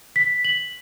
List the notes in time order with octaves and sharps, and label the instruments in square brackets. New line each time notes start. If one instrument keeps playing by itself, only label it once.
[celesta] B6
F#7